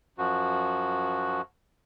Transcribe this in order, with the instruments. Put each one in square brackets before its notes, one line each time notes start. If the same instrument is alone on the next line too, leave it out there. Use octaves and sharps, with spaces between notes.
[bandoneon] F#2 F3 F#4